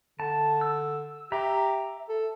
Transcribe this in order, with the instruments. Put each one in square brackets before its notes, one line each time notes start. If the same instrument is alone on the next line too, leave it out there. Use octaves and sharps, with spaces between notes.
[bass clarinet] D3 [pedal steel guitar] A5
[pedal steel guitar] E6
[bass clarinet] G4 [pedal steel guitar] E5 A#5
[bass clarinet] A4